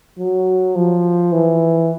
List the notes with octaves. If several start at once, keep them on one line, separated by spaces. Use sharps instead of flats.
F#3
F3
E3